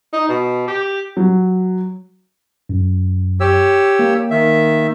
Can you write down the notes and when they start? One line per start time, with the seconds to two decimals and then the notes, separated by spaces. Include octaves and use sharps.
0.13 D#4
0.29 B2
0.68 G4
1.17 F#3
2.69 F#2
3.40 G4 C#5 E6
3.99 A#3
4.30 D#3 E5